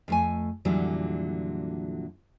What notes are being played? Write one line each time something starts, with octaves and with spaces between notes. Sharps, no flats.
F2 A3 G#5
F2 A#2 D3 E3 F#3 G3